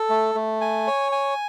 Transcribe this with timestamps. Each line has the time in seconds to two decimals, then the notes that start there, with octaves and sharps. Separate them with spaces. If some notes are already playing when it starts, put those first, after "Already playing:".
Already playing: A4
0.10 A3
0.35 A3
0.61 G#5
0.87 C#5
1.12 G#5